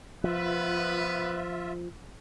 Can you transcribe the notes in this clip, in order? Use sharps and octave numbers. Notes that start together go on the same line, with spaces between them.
F3 B3 F4 B4 E5